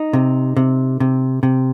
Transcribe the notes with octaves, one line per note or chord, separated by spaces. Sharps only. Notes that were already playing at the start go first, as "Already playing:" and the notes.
Already playing: D#4
C3
C3
C3
C3